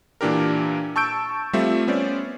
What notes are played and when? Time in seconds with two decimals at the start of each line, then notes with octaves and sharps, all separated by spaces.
0.21 A#2 E3 D4 G4 A#4
0.96 A5 C#6 E6 G6 D7
1.53 G3 A3 C4 F4 E5
1.87 B3 C#4 C5 D5